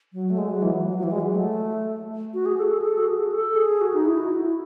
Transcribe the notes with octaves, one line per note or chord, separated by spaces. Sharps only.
F#3
A3
G#3
F#3
E3
F#3
F#3
F#3
E3
G#3
F#3
A3
F#4
G#4
A4
G#4
A4
F#4
G#4
A4
G#4
F#4
D#4
E4
F#4
E4